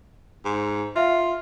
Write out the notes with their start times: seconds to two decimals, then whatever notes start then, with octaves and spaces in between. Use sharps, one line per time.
0.45 G#2
0.96 F4 E5 F5